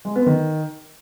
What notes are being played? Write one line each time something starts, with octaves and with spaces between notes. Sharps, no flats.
G#3
B3
D#3